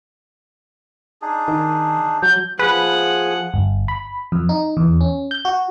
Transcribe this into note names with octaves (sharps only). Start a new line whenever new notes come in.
D4 D#4 G#4
D#3
F#3 G6
F3 G#4 B4 F#5
G1
B5
F2
D#4
E2
C#4
G6
F#4